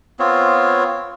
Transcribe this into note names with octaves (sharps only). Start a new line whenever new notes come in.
B3 C4 F4 C#5